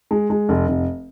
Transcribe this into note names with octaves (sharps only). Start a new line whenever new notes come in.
G#3
G#3
F1
F1